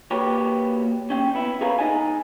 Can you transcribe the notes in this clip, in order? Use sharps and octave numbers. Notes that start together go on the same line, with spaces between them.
A#3 F#4 G4 B4 C#5
C#4 G5
B3 E4
G#4 A#4 B4 C#5 F5 A#5
D#4 D#5 G#5